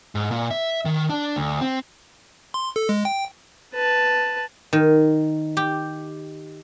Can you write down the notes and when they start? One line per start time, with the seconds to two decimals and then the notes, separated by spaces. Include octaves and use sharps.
0.15 G#2
0.31 A#2
0.51 E5
0.85 D#3
1.10 D4
1.36 D2
1.61 C4
2.54 C6
2.76 A4
2.89 G#3
3.05 G5
3.74 B4 A5
4.73 D#3
5.57 G4